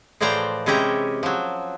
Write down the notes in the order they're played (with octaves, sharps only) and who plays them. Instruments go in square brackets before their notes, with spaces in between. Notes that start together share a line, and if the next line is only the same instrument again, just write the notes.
[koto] A2 E3 F3 C5 D5 A#5
C3 G#3 C#4 E4 G4 A#5
F3 F#3